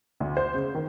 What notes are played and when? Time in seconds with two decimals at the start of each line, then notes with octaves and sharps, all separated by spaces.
0.20 D2
0.37 C5
0.54 C#3
0.75 D#3